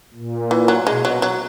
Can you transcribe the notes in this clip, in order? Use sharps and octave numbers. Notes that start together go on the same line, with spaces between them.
A#2
E3
F#3
B2 G#3
F#3
F#3